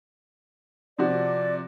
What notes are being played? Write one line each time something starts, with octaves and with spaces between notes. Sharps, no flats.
C3 F3 F#4 D5